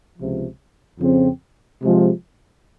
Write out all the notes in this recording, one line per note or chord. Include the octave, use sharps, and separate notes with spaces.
C#2 C3 F3
F2 C#3 F3 C4
C3 F3 G#3